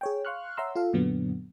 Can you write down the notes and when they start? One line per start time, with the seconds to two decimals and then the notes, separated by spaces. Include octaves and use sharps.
0.01 G#4 C#5 G5
0.25 F5 C6 C#6 F6 F#6
0.57 C#5 E5 F#5 A#5 C6 E6
0.75 F4 A4 F5
0.93 F#2 A#2 D3 F#3 B3